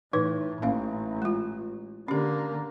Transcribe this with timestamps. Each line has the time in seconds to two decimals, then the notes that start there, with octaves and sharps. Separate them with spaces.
0.13 A2 E3 D#4 B4
0.62 A1 A#3 C#4 F5
1.22 G#3 F4
2.08 D3 A#3 C#4 G4